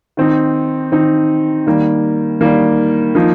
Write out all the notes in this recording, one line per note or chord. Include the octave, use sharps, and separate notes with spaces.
D#3 C4 D#4
D#3 C4 D#4
D#3 G3 A#3
D#3 G3 A#3
F3 A#3 D#4